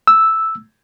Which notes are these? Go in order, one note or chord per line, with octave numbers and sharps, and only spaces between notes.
E6